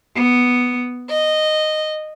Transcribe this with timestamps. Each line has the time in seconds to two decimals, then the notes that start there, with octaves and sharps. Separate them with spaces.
0.15 B3
1.09 D#5